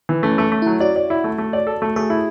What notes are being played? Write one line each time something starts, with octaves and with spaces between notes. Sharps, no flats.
E3
A3 C#4
A3
A3
F#3 E4
F#4 D5
D5
E4
A3
A3
D5
A4
A3
A3 G#4
E4